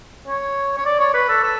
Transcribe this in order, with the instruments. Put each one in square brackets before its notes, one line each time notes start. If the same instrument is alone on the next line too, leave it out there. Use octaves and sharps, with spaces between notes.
[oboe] C#5
C#5
D5
C#5
B4
A4
A4